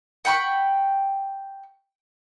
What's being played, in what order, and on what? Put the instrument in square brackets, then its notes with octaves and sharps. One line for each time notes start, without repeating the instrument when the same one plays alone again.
[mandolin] F#5 G5 B5 C#6